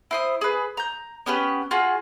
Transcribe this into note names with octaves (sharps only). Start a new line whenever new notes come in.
E4 C5 D#6
G#4 B4
A#5 G6
B3 C#4 G4 B4
F4 F#4 G#4